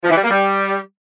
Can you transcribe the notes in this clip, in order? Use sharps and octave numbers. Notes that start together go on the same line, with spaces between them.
F3
E3
G3
A#3
G3